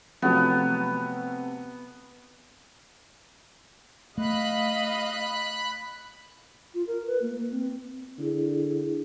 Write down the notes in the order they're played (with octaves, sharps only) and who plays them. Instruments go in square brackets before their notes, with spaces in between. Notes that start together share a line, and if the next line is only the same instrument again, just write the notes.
[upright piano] C3 A3 [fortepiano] F3 F#3 [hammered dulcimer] B3
[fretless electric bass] A3 [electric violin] D#5 F5 [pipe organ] B5 F#6
[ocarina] F4
A#4
B4
A#3
A#3
C4
[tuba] D3 [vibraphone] E4 G#4